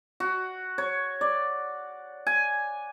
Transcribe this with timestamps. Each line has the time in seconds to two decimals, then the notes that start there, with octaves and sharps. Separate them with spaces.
0.20 F#4
0.78 C#5
1.21 D5
2.27 G#5